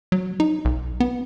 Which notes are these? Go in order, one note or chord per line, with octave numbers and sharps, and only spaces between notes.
F#3
D#4
B1
B3